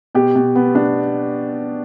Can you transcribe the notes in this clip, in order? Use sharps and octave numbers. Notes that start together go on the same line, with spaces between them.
B2 G4
B2
B3
D4